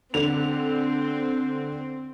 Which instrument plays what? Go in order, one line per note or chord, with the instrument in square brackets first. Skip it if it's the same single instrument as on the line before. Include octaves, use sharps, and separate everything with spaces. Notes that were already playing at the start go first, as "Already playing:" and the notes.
[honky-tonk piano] D3 F7 [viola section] C4